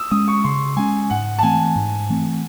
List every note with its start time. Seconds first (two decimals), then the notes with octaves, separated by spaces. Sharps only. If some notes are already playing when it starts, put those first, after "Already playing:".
Already playing: D#6 E6
0.11 G#3 C#4 D#6
0.28 C#6
0.44 C#3 C6
0.77 G#3 C#4 G#5
1.10 G#2 F#5
1.39 A5
1.43 E3 A3 C4 G#5
1.76 G#2
2.10 E3 A3 C4